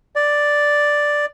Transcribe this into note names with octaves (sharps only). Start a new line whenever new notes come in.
D5